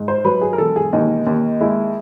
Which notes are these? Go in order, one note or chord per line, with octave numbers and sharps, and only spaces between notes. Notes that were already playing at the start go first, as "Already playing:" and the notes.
Already playing: G#2
C5
F#3 B4
G#4
A#4
E1 A4
G#4
D#2 D#4
D#2
G#3 E4